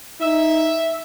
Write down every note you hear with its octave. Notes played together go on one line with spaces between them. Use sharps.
D#4 E5